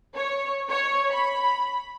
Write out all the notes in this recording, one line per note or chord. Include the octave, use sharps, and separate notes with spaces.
C#5
C#5
B5